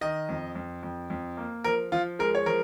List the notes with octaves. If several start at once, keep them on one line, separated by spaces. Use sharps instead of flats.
D#3 D#5
F2
F2
F2
F2
A#3
F3 A#4
F3 F4
G#3 A#4
C#5
F3 A#4